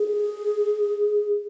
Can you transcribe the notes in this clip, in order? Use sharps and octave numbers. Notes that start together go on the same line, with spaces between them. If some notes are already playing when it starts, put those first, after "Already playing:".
Already playing: G#4